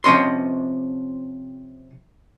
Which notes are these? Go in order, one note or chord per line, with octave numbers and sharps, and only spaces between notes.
C3 F3 C#4 D#5 C6